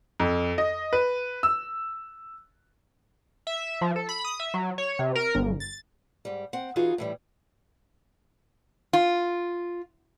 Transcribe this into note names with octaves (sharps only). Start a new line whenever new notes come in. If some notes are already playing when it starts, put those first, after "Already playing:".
F2
D#5
B4
E6
E5
F3
A4
B5
D#6
E5
F#3
C#5
C3
A#4
G1
A6
G#2 G3
C4 F#5
E3 D#4 F4 F#4 G#4
A2 E3 G3
F4